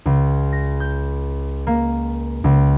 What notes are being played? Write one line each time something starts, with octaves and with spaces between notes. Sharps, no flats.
C#2
A#6
G6
A#3
C#2